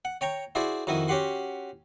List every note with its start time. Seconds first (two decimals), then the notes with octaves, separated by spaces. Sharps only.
0.05 F#5
0.21 C#5 G5 A#5 C#6
0.55 E4 F#4 G#4 C5 D5
0.87 F2 D#3 E4 F#4 D#5
1.08 C#4 F#4 G4 F#5 C6